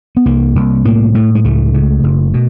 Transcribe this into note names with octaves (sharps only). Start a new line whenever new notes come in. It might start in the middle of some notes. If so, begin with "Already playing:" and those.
B3
C2 A#3
C2
A2 A#3
A2 A3
G#3
C#2 A3
C#3
F#1
B2